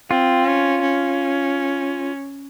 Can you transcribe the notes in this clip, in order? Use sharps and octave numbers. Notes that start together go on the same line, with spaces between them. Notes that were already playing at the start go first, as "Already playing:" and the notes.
C4 F4
C#4
C#4